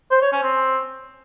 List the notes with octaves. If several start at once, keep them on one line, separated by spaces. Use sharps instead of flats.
C5
C#5
C#4
C4